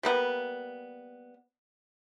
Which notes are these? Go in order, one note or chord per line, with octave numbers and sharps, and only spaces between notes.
G3 A#3 B3